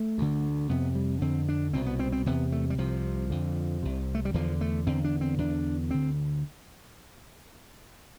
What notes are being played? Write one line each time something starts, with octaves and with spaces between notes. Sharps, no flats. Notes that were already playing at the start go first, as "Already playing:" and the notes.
Already playing: A3
D2 D3
F2 C3 B3
G3
F2 D3 C4
D4
C2 B2 C4
B3
C4
C4
E2 C3 B3
A3
G3
C2 C3 F3
F2 D3
C2 C3
A3
G3
E2 D3 F3
A3
E2 D3 C4
D4
C4
E2 D3 D4
D2 D3 C4